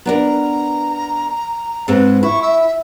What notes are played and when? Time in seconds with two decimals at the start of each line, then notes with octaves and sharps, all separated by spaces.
0.06 B3 D4 A#4 A#5
1.88 G#2 G#3 C4 B4
2.23 E4 C#6
2.42 E5